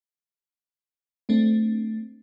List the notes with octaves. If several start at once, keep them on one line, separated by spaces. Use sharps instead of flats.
A3 C4 D4